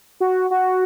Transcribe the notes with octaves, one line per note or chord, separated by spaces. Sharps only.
F#4
F#4